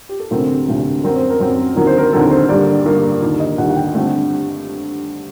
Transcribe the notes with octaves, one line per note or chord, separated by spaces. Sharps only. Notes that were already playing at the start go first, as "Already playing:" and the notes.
G4
A4
D2 C3 F#3 A3 C4 A#4
D2 C3 F#3 A3 C4
F#2 F#3 C4 A#4
C5
A#4
F#2 F#3 C4
D#2 D3 F#3 C4 A#4
C5
A#4
D#2 D3 F#3 C4 A4
C5
G2 D3 G3 A#3 D5
G2 D3 G3 A#3
D#2 D3 G3
D#5
D#2 D3 G3 F#5
F#5
G5
G2 D3 A3 C4 F#5